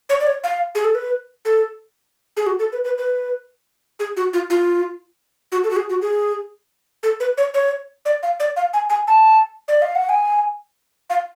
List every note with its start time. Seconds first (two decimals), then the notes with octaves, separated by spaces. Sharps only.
0.09 C#5
0.20 D5
0.26 C#5
0.44 F5
0.75 G#4
0.84 A4
0.95 B4
1.45 A4
2.37 G#4
2.46 F#4
2.59 A4
2.72 B4
2.84 B4
2.98 B4
3.99 G#4
4.16 F#4
4.33 F4
4.50 F4
5.52 F#4
5.64 A4
5.70 F#4
5.76 G#4
5.90 F#4
6.01 G#4
7.03 A4
7.20 B4
7.37 C#5
7.54 C#5
8.05 D5
8.23 F5
8.40 D5
8.56 F5
8.73 G#5
8.89 G#5
9.07 A5
9.68 D5
9.82 F5
9.95 F#5
10.09 G#5
11.10 F5